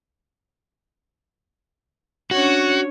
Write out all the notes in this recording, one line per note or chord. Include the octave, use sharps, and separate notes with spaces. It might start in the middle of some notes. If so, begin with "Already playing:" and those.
C#4 D4 F#4 C#5